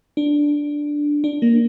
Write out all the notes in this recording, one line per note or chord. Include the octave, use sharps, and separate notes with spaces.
D4
D4
A#3